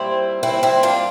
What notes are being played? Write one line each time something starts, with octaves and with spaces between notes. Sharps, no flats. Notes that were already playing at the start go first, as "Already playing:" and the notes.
Already playing: A#2 G3 C4 E4
C4 E4
C4 E4
D4 F4